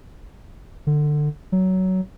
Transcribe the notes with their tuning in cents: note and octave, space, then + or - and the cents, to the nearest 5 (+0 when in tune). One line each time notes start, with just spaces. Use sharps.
D3 +20
F#3 +15